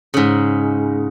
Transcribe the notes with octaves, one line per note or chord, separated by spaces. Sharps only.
G#2 C#3